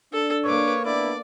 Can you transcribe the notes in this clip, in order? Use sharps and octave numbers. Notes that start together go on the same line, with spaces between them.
D4 A4
A#3 B4 C#5 D6
B3 D4 E4 D5